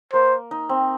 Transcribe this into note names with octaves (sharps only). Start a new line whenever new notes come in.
A#3 C5
D#4
C4